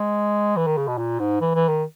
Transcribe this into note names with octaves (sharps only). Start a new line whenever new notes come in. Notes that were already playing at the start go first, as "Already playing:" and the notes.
Already playing: G#3
E3
D#3
C#3
B2
A#2
G#2
E3
E3
D#3